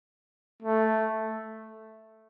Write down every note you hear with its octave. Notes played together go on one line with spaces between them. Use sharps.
A3